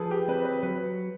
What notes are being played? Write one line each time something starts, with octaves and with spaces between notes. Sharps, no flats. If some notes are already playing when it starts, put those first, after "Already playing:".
Already playing: F3 G#4 A4 B4
G4
C4 B4
B4
F#3 B4